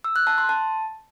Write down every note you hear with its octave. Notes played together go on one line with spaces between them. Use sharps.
E6
F#6
A5
C6
A5